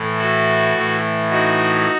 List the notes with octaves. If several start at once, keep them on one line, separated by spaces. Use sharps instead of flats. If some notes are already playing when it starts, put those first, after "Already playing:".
Already playing: A2 E3
F#4 A4
A2 E3
D#4 F#4